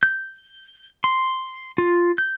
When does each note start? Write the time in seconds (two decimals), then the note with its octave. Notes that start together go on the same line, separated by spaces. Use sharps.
0.03 G6
1.04 C6
1.78 F4
2.18 G6